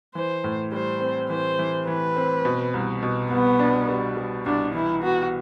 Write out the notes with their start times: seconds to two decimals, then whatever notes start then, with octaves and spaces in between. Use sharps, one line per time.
0.15 E3 C5
0.44 A2
0.72 G3 C5
1.01 C4
1.30 E3 C5
1.59 E3
1.87 E3 B4
2.16 C4
2.45 B2
2.74 C2
3.03 B2
3.31 C2 B3
3.59 D4
3.89 G3
4.17 G3
4.46 C2 D4
4.74 E3 E4
5.03 B3 F#4